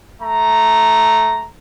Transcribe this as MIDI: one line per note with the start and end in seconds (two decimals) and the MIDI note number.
0.22 1.47 57
0.22 1.47 82